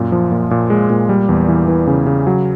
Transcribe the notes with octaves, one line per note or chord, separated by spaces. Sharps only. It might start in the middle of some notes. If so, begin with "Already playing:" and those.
Already playing: F#2 A#2
F3
A#2
A#2
G#3
A#2
G3
E2
E3
E3
C#3
C#3
F#3